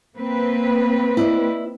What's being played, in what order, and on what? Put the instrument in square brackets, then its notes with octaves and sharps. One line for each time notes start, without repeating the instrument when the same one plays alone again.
[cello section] A#3 C4 B4
[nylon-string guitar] E4 D5 D#5